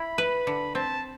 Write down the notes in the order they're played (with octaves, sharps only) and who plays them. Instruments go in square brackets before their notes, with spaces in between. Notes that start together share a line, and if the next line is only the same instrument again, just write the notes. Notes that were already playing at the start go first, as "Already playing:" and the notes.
Already playing: [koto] E4 [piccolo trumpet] B5
[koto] B4
D3
[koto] C4 [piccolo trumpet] A5